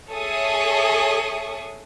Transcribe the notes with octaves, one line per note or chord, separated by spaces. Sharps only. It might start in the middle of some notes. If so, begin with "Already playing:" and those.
G#4 A4 C#5 E5 C#6 D#6